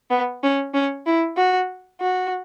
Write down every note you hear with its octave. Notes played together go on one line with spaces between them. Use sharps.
B3
C#4
C#4
E4
F#4
F#4